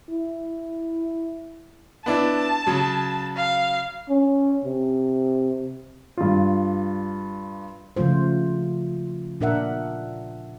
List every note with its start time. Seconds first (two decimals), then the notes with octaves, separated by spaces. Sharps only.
0.10 E4
2.06 B3 D4 E4 A5
2.67 C#3 F#3
3.37 F5
4.09 C#4
4.65 C3
6.17 G2 F4
7.96 C#3 F3 A3 F4 C5
9.41 A#2 D4 A#4 E5 F#5